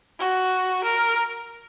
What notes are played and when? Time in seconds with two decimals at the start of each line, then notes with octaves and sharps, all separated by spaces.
0.19 F#4
0.83 A#4